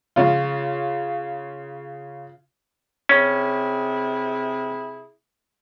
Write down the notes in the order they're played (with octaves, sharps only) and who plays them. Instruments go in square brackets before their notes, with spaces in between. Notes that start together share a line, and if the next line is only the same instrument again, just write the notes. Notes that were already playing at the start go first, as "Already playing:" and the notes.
[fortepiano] C#3 F4
[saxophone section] C3 E4 G#4 [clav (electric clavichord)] C#4